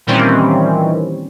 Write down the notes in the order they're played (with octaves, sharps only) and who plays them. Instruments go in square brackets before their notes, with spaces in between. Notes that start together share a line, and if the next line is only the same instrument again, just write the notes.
[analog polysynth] A#2 D#3 E3 G3 C4 C#4